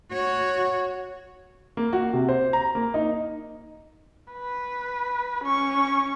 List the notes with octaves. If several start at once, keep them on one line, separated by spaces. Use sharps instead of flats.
F#4 C#5
A#3
F#4
C3
C5
A#5
A#3
D#4
B4
C#4 C#6